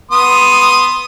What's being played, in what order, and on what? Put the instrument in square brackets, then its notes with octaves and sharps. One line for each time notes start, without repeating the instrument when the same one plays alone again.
[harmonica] B3 C6 D#6